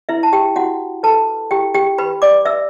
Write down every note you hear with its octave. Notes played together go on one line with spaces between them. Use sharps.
E4 B4 E5
A5
G4 G5
E4 F#4 F#5
A4 B4 A5
E4 G4 G5
G4 G5
G4 B4 B5
D5 D6
B4 E5 E6